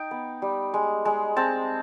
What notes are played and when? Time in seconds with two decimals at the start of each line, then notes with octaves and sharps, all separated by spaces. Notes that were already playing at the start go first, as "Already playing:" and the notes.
Already playing: D#4 G5
0.11 B3
0.42 G3
0.74 G#3
1.05 G#3
1.36 C4 A5